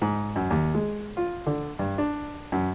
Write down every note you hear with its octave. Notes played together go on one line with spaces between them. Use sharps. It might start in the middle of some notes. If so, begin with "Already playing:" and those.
G#2
F#2
D#2
G#3
F4
D3
G2
D4
F#2